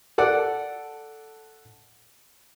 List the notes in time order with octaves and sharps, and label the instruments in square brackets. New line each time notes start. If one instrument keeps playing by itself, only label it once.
[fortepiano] A4 D5 F#5